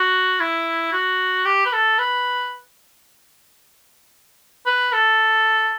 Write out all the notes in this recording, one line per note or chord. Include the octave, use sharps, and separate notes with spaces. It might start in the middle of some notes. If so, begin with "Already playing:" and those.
Already playing: F#4
E4
F#4
G4
B4
A4
B4
B4
A4